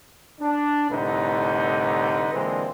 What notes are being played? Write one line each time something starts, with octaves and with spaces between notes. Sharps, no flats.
D4
C2 A2 D3 D#4 B4
A#2 D3 E3 G#3 C4